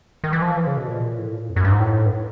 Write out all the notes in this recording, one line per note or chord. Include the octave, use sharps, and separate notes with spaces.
D#3
E3
F3
E3
C#3
B2
A#2
A2
A#2
F2
F#2
G2
G#2
A2
G2